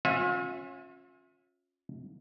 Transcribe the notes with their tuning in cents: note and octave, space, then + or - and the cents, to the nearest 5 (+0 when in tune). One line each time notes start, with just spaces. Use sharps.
C#4 -20 F4 +40 E5 +0